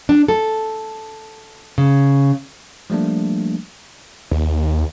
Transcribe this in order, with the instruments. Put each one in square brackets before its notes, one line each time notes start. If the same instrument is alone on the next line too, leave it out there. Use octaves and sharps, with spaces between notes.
[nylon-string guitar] D4
A4
C#3
[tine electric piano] F3 G3 A3 A#3 D4
[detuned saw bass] D#2